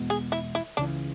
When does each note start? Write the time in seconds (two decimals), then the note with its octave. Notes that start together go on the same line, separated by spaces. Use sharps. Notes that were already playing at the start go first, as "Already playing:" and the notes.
Already playing: E2 B2 G#3 B3
0.10 G#4
0.32 E4
0.55 E4
0.77 C#2 C#3 E3 D4